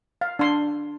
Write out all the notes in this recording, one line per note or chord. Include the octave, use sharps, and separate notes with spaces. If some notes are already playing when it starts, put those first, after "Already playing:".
F5
D4 C6